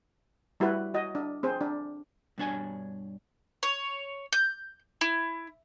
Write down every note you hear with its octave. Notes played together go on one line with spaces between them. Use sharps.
G3 E4 F#4 B4
F#4 D#5
D4
C4 G#4 C5
D4
G2 B2 D4 C#5 G#5
C#5
G6
E4